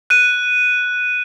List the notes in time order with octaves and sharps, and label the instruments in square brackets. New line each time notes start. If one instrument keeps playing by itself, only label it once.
[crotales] F#6 D#7